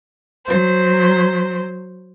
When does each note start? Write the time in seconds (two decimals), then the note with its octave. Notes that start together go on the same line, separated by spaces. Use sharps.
0.45 F#3 C5